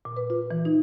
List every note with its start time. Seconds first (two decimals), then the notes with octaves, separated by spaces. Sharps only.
0.05 A#2
0.17 B4
0.30 F4
0.51 E3
0.65 D#4